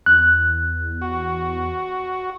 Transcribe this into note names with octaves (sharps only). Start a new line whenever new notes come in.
E2 F#6
F#4